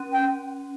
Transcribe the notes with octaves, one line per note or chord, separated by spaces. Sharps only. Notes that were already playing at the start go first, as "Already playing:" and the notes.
Already playing: C#4
G5